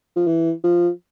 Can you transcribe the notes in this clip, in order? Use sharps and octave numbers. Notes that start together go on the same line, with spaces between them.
F3
E3
F3